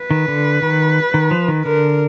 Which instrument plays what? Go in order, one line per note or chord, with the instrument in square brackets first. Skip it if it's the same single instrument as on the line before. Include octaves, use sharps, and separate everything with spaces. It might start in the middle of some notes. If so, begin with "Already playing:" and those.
Already playing: [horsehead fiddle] B4
[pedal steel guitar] D#3
D3
D#3
D#3
F3
D#3
[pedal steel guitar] D3 [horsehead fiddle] A#4